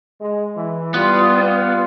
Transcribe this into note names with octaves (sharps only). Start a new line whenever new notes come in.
G#3
E3
G3 B3 F4